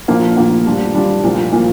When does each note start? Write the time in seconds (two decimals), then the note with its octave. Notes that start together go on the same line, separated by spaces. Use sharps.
0.08 A#2 F3 A#3 D4
0.37 A#2 F3 A#3 D4
0.66 G3 D4 F4
0.95 G3 D4 F4
1.24 A#2 F3 A#3
1.52 A#2 F3 A#3